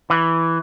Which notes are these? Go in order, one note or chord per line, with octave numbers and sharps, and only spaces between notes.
E3